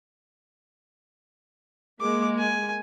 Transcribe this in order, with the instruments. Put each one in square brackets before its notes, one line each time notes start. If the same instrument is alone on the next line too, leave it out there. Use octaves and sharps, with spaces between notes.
[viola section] G#3 A#3 [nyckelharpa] D6
[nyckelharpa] G#5